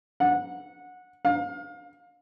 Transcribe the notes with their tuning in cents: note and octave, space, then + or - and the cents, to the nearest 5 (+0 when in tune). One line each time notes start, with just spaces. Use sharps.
F#5 -20
F5 +30